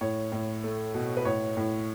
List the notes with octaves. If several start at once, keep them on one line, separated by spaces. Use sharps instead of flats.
A2 C#5
A2
A3
B2
B4
A2 C#5
A2